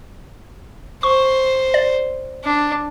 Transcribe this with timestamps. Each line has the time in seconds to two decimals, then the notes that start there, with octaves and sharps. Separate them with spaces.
1.03 C5 C#6
1.74 D5
2.44 D4